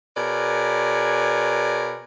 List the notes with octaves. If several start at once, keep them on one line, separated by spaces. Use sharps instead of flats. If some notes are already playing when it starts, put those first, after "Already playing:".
B2 G#4 A#4 B4 C#5 D5